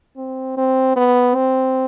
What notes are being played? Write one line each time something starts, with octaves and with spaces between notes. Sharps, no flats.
C4
C4
B3
C4